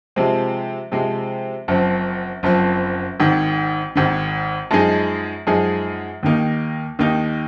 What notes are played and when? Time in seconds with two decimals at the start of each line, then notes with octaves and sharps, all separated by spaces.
0.16 C3 F3 G#3 C4
0.92 C3 F3 G#3 C4
1.68 F#1 F#2 F3 C4
2.43 F#1 F#2 F3 C4
3.20 G#1 G#2 D#3
3.96 G#1 G#2 D#3
4.71 F#2 F3 G#3 D#4 G#4
5.47 F#2 F3 G#3 D#4 G#4
6.23 D#2 D#3 A#3 D#4
6.99 D#2 D#3 A#3 D#4